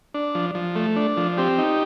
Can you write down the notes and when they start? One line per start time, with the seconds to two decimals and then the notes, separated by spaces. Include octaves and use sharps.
0.14 D4
0.35 F3
0.55 F3
0.76 A3
0.96 D4
1.17 F3
1.38 C4 G4
1.58 D#4